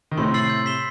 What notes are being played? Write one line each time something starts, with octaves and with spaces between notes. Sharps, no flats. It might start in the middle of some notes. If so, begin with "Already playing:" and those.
D#3
A2 C3 C6
E6 A6 C7 F#7
G6
B6 E7 G7